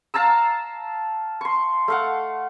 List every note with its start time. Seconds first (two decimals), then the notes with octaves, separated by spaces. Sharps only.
0.14 F5 A5 A#5 E6
1.41 C6 C#6
1.88 A3 F5 F#5